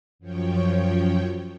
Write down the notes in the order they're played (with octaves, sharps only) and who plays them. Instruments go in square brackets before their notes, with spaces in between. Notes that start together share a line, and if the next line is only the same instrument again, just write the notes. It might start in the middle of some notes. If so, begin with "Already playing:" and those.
[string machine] F#2 F3 C#5 G5